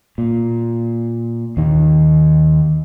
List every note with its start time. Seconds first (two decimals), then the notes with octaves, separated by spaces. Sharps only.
0.18 A#2
1.57 D#2 D#3